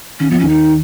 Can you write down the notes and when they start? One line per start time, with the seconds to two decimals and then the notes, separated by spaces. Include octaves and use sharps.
0.20 D#3 C#4
0.31 F3 B3
0.40 D#2 D#3 C#4
0.49 D#4